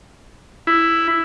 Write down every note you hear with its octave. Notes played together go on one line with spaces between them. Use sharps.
E4